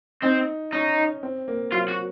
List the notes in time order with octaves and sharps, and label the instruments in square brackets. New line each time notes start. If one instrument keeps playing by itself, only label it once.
[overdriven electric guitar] C4 [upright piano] D#4
[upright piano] C#4 [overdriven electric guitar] D#4
[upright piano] C4
A#3
[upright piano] F#3 [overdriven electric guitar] F4
[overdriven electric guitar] F#4